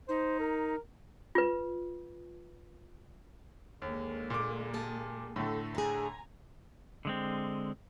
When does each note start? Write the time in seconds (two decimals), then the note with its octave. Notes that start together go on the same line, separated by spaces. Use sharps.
0.09 D#4 C5
0.40 A#4
1.35 F4 B4
3.82 D#2 D3 G#3 A#3
4.30 A#2 D6
4.74 G4 G#4 A5
5.36 A2 D3 A3 A4
5.75 D4 G#4 G#5 A#5
7.05 D3 G#3 C4